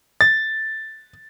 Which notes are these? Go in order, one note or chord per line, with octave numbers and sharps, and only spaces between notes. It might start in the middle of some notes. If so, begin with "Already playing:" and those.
A6